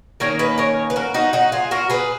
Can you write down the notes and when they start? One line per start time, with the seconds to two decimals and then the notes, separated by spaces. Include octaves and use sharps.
0.20 D#3 A#3 C#4 A#4 C#5
0.39 B4 D#5
0.58 A#4 C#5
0.90 B4
0.96 F#4 A#4
1.14 D#4 F#4
1.33 D#4 F#4
1.52 F4 G#4
1.71 F#4 A#4
1.90 G#4 B4